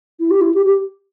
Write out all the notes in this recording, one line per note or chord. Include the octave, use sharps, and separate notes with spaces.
E4
G4
E4
G4
G4